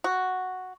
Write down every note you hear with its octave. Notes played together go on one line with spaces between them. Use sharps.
F#4